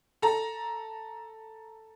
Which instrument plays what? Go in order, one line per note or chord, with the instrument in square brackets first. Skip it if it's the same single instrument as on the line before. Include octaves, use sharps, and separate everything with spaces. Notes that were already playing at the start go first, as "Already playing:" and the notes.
[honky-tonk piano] A4 A#5